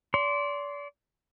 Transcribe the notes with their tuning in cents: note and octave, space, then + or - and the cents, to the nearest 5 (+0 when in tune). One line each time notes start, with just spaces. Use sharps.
D5 -35 C6 +0